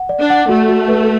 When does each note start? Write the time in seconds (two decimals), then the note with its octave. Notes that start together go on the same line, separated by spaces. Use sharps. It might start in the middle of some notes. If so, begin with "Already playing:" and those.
Already playing: F#5
0.09 D5
0.20 D4
0.30 F#5
0.49 A3 F#4
0.69 F#4
0.88 B4